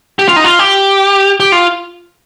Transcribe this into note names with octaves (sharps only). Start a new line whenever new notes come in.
G4
F4
D#4
F4
G4
G4
F4